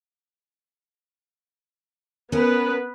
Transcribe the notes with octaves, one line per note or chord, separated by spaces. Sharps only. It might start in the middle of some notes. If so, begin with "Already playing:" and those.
B3 C#4 A#4 B4